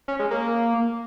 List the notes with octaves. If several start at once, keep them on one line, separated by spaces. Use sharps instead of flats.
C#4
G#3
A#3